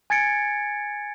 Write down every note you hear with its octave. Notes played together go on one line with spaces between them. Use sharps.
G#5 G#6 A6 C#7 D7